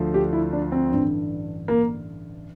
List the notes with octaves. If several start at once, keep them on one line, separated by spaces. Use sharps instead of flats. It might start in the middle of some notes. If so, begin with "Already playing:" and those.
Already playing: D2 D3 F3
G4
E4
D4
C4
A1 G2 D3
A#3